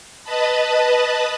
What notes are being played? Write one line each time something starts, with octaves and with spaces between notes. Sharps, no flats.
B4 D#5 A5 B5